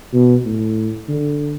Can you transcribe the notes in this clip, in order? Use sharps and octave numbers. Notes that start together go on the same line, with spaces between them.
B2
A2
D3